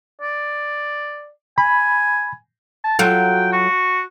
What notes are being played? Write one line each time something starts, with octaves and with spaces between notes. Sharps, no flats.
D5
G#5 B5
A5
F#3 F4 A4 G5
F#4